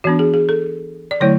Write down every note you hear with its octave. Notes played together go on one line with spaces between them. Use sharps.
E3 B3 D4 F#4
G#4
G#4
A4
D5
D3 F#3 A3 E4 C#5